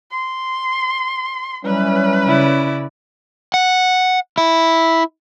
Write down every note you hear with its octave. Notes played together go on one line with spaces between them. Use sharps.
C6
E3 F#3 G3 C#4 B4
C#3 E4 D5
F#5
E4